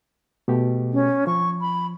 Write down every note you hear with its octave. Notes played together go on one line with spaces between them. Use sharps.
B2 A3 G4
C#4
F3 C#6
B5